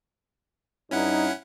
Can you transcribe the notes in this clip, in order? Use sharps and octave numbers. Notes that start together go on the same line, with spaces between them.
G2 C#4 D#4 E4 F#5